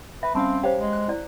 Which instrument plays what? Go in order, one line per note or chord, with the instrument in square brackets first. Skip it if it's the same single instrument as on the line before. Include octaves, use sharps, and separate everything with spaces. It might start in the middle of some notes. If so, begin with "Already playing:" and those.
[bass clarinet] B4 [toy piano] E5
[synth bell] G3 C#4 F5 [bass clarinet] C4 [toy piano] A5 B5 C#6
[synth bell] G4 C#5 F5 [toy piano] C5 G5
[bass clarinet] G#3
[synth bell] F#6
[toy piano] E4 D5